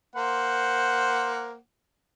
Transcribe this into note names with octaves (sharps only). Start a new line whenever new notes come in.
A#3 C5 F#5